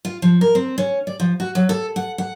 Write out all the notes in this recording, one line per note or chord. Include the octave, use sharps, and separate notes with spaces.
F4
F3
A#4
C4
C#4
D5
F3
F#4
F#3
A4
F#5
F#5